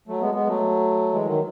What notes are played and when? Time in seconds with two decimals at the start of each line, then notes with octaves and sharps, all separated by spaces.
0.08 F#3 A3
0.21 G#3 B3
0.34 G#3 B3
0.47 F#3 A3
1.13 E3 G#3
1.26 D#3 F#3